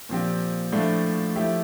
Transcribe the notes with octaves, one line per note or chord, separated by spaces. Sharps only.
A#2 F3 C4 G4
A2 F3 A3 D4
F3 A3 E4 G4